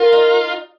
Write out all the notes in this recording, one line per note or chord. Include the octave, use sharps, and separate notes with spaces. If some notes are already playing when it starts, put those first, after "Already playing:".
Already playing: F4 A#4
D#4